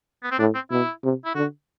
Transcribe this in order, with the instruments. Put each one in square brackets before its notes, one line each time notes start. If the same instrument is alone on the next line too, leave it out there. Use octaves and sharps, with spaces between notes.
[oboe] B3
C4
[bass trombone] A2 [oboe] D4
[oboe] C4
[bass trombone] B2 [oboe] E4
[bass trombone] C3
[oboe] E4
[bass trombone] D3 [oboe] F#4